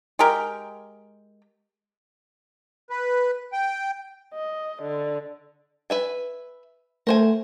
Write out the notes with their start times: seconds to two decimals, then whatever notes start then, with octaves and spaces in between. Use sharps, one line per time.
0.19 G#3 G4 A#4 G5
2.90 B4
3.53 G5
4.34 D#5
4.83 D3
5.90 B4 E5 G#5
7.07 A3 A#4 C5 G#5